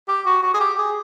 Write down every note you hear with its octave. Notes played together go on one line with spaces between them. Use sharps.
G4
F#4
F#4
G#4
G4
G#4